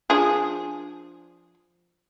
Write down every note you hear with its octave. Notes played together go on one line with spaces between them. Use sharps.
F3 D4 G#4